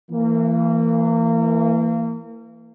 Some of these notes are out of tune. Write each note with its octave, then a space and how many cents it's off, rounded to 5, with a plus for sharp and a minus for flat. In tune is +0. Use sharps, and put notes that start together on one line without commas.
E3 +10 A#3 -30